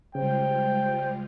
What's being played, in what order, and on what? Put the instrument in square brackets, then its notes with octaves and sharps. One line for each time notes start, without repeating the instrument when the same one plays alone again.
[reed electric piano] C#3 [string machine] G3 G#3 F4 [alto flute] C5 [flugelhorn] G5